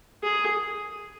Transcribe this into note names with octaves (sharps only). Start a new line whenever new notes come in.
G#4